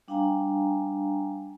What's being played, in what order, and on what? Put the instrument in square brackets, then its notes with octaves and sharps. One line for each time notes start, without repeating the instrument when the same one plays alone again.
[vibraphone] G3 D4 F5 G5 G#5 A#5